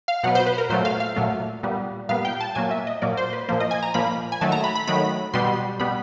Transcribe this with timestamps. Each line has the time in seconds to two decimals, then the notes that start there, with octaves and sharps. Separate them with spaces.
0.08 F5
0.23 B2 F#3 B3 F#5
0.35 C5
0.46 B4
0.58 A#4
0.70 A#2 F#3 A3 C5
0.85 F5
1.00 F5
1.16 A#2 F#3 A3
1.63 A#2 G3 B3
2.09 A#2 G3 B3 F5
2.25 G5
2.41 A5
2.55 A#2 F#3 A#3 G#5
2.71 E5
2.87 D#5
3.02 A#2 F#3 A#3 D5
3.17 C5
3.33 B4
3.49 A#2 F3 A#3 C5
3.60 D#5
3.71 G#5
3.83 A#5
3.94 A#2 F3 A#3 B5
4.32 G#5
4.41 D#3 F#3 A3 A5
4.52 A#5
4.64 B5
4.75 B5
4.87 D#3 F#3 A3 B5
5.34 B2 G3 B3 C6
5.80 B2 G3 B3 B5